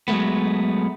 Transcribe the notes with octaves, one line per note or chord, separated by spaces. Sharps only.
F#3 G#3 A3 B3